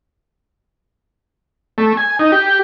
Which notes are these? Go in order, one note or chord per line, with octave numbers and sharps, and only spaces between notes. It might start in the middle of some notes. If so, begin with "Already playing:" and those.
A3
G#5
D#4
G4